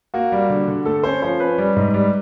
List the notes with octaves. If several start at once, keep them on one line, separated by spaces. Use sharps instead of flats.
A#3 F#4
G3
D3
D3
A3 A4
C#4 C5
F3 C5
C#4 B4
G3
G#2
G3